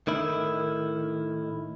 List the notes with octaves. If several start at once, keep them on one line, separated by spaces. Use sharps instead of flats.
A2 D#3 E4